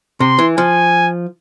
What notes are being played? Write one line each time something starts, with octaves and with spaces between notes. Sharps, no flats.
C3 C6
E3
F3 G#5